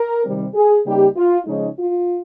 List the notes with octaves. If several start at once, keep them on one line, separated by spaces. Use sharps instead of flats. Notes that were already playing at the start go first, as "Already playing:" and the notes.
Already playing: A#4
C3 D#3 G3 C4
G#4
C#3 G3 A#3 D#4 G4
F4
C#3 F3 G#3 C#4 D#4
F4